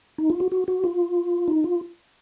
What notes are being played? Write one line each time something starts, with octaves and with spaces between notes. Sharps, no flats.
D#4
F4
F#4
F#4
F#4
F4
D#4
F4